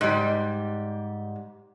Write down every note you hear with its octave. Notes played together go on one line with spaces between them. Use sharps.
G#2 G3